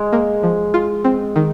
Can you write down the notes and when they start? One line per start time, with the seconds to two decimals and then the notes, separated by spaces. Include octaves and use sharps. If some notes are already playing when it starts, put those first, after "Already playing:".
Already playing: G#3
0.13 A#3
0.43 F3
0.74 F4
1.04 C4
1.36 D#3